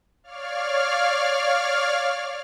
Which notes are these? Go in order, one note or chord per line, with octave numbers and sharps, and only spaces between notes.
C#5 D5 F5 F6